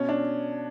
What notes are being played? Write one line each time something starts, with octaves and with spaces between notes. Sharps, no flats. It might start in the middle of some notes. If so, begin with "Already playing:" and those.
Already playing: B2 C#4
D4